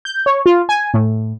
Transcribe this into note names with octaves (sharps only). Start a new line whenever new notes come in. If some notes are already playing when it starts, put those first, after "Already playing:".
G6
C#5
F4
G#5
A2